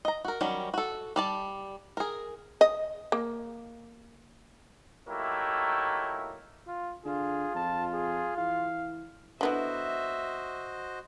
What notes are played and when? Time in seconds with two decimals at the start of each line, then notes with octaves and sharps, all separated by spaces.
0.05 D#5 A#5
0.25 F#4 A#4
0.41 D#3 F#3 G3 C#4
0.74 F#4 A4
1.16 G3 D5 A5
1.97 G#4 A#4
2.61 D#5
3.12 A#3
5.08 F#3 A3 A#3 D#4 E4 G4
6.67 F4
7.05 D3 F4 G#4
7.55 F2 A5
7.94 G#4
8.37 E3 F5
9.41 D3 B3 E4 F#4 C5 D#5 E5